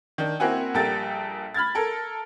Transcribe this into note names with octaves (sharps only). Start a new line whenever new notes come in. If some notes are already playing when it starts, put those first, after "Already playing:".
D#3 D4
A#3 C4 E4 F#4 F#5 G#5
A#1 G3 A4 A#4 G5 A6
B5 F6 G#6 A6
A4 A#4